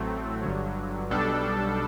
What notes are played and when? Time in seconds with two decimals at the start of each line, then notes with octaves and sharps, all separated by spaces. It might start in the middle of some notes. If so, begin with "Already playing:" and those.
Already playing: A1 A2 F#3 A3 C4
0.43 G1 G2 D3 F#3
1.10 B1 B2 G3 D4 A4